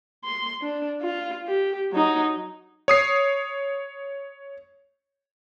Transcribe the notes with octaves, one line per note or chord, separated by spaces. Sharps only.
C6
D4
F4
G4
F#3 D#4
C#5 D#6 C7